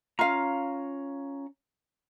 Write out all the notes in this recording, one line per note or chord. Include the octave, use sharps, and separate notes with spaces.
C#4 F4 F5 A#5